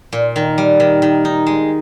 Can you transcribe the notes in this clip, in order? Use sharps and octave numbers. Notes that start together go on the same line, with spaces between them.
A#2
D#3
G3
D#3
D#3
D#4
G#3